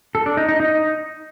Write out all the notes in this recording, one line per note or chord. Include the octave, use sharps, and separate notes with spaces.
A4
D4
D#4
D#4
D#4